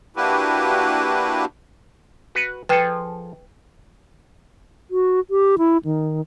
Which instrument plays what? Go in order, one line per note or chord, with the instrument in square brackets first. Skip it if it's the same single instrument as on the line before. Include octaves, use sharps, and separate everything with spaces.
[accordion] A#3 D4 E4 F#4 G4 B4
[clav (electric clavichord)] F#4 B4
[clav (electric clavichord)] F3 G#4 A4 [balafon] B4 G5
[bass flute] F#4
G4
E4
D#3